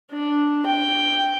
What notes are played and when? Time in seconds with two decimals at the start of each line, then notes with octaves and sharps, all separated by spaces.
0.12 D4
0.66 G5